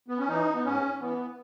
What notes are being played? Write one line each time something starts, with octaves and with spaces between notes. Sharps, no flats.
B3
C#4
E3 D#4
B3
G#2 C#4
E3 B3